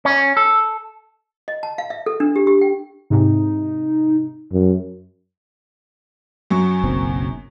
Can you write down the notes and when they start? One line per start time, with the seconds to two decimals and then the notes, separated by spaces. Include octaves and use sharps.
0.05 C#4
0.37 A4
1.48 D#5
1.63 A5
1.78 F5
1.90 E5
2.06 A4
2.20 D4
2.36 G4
2.47 G4
2.61 G5
3.10 G#2 C3 D#4
4.53 F#2
6.51 F#2 F#3 C#6
6.84 F#1 B1 C4